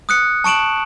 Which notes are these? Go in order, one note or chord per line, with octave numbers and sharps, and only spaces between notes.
D#6 F#6 C#7
A5 C#6 D7 E7 F#7